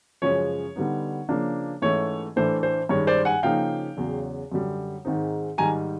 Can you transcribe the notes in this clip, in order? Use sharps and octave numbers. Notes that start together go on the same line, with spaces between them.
F#2 C#3 F3 G#3 C#4 C#5
D3 G3 B3 D#4
C#3 F3 A#3 D4
G#2 E3 A3 C#4 C#5
A2 E3 A3 D4 C5
C5
G2 D#3 G#3 C#4 C#5
C5 D5
F#5 G#5
C#3 F3 A#3 D#4 F5 G5
E2 C#3 F#3
F#2 D3 G3
G#2 D#3 G#3 C4 D#4
G#2 D#3 G3 G#5 A#5